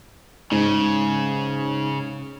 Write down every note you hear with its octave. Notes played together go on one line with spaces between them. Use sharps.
G#2 C#3